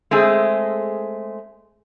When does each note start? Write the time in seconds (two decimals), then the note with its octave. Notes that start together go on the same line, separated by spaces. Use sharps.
0.11 G#3 A3 C4 G#4